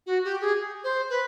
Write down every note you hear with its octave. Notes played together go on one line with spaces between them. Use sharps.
F#4
G4
G#4
C5
B4